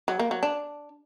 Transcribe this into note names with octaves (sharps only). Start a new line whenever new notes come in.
F#3
A#3
F#3
D4